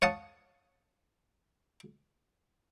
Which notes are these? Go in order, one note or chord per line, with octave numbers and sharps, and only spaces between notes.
C#5 F5 F#5 A5 D#6